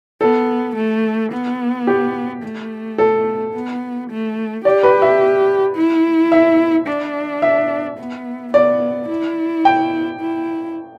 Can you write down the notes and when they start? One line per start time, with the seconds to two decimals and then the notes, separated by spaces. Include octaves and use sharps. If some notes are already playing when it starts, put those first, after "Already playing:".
0.21 B3 A4
0.76 A3
1.32 B3
1.87 G4
2.43 A3
2.98 A4
3.54 B3
4.10 A3
4.65 G4 D5
4.83 B4
5.02 E5
5.76 E4
6.32 E5
6.87 D4
7.42 E5
7.98 B3
8.54 B3 D5
9.09 E4
9.65 G5
10.21 E4